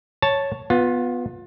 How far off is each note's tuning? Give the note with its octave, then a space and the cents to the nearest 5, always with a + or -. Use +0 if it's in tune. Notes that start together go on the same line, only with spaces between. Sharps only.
C#5 +0 A5 +0
B3 +0 F4 +25